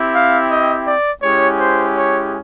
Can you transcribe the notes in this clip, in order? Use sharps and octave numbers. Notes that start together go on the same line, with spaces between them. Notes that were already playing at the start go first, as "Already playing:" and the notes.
Already playing: C4 E4 G4
F5
D#5
D5
G#3 C#4 E4 G4 C#5
C5
C#5